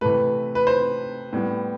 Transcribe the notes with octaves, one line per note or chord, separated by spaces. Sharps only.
C3 E3 A3 B4
B4
C5
A2 G3 B3